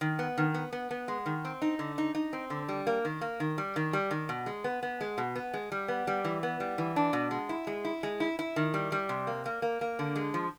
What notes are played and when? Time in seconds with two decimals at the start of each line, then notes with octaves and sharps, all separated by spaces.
0.01 D#3
0.19 B3
0.38 D#3
0.54 B3
0.73 B3
0.91 B3
1.08 G#3
1.26 D#3
1.45 C4
1.62 D#4
1.79 D3
1.98 D#4
2.15 D#4
2.33 C4
2.50 D3
2.69 G3
2.87 A#3
3.05 D#3
3.21 A#3
3.40 D#3
3.58 G3
3.76 D#3
3.93 G3
4.11 D#3
4.29 B2
4.46 G#3
4.64 B3
4.83 B3
5.01 G#3
5.18 B2
5.35 B3
5.54 G#3
5.72 G3
5.88 B3
6.07 G3
6.24 E3
6.43 B3
6.60 G3
6.78 E3
6.96 D4
7.13 B2
7.31 G#3
7.49 E4
7.67 G#3
7.85 E4
8.03 G#3
8.20 E4
8.39 E4
8.56 D#3
8.74 G3
8.92 G3
9.09 C3
9.27 A#3
9.46 A#3
9.62 A#3
9.81 A#3
9.99 D3
10.16 G#3
10.34 F3